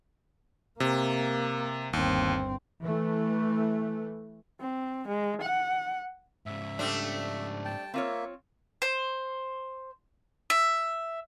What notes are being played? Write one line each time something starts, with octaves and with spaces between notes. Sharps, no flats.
C3 A#3
G1 D#2 C4
E3 A3
C4
G#3
F#5
G#2 C#3 E5
G3 A3 C4 D4
G5 A5
A#3 C4 F4 C#5 E5
C5
E5